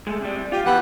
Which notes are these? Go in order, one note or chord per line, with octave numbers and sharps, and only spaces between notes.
G#3 A3
C3 G3
F4 G4
E3 B3 G4 F#5 B5